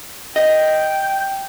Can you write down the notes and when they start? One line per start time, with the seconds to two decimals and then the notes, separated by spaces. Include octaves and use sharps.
0.36 D#5 G5